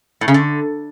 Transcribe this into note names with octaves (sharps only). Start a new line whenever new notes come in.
A2
C#3
D3